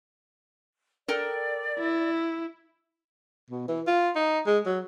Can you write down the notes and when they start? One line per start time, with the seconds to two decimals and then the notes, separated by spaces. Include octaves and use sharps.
1.08 A4 A#4 D5 G5
1.79 E4
3.50 B2
3.68 E3
3.87 F4
4.16 D#4
4.46 G#3
4.66 F#3